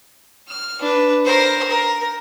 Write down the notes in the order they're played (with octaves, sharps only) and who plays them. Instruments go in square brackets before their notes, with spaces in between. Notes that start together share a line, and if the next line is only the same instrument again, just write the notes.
[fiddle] F6
D4 B4
A#4 C5
A#4